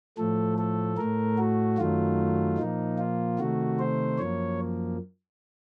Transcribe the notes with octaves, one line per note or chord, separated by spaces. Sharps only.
A2 F3 A3 A4
A4
A2 A3 A#4
F#4
F#2 D#3 F#3 A3 F4
A#2 F3 A#3 D#4
F4
C3 D#3 A3 F#4
C5
F#2 F3 A#3 C#5